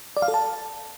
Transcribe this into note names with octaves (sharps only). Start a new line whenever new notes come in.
D5
F5
A4
A5